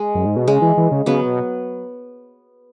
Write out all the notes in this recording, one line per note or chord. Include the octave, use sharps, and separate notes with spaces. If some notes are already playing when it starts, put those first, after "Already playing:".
Already playing: G#3
F#2
G#2
B2
C#3 G#3
E3
E3
C#3
C#3 F#3 B3
B2